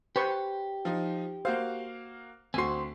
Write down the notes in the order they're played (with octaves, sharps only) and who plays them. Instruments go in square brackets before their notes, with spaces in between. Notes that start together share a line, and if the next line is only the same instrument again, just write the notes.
[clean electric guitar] G4 [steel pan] B4 C5 C#6
[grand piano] F3 D#4
[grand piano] A#3 F#4 F5 [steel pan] C5
[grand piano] D2 C7 [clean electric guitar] C4 C5 [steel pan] F#4 G#5